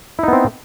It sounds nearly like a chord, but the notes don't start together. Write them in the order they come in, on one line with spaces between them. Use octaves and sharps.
E4 D#4 B3 C4